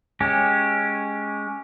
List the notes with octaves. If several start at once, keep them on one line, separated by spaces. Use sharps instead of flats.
G#3 C#4 G4